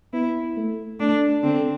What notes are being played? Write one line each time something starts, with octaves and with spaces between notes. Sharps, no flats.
B3 E4
A3
A3 D4
D3 C4